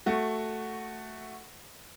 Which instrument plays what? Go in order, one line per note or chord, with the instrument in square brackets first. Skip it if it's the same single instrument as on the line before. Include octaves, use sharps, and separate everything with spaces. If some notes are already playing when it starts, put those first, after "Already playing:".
[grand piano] A3 F#4